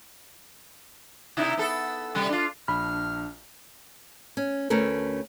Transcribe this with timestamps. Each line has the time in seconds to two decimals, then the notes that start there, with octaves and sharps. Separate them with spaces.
1.37 C3 D#4 E4
1.57 B3 A4
2.15 C3 G3
2.29 D4 F4
2.68 A#1 D4 B5 F6
4.37 C#4
4.70 D2 A3 C#4 A#4 B4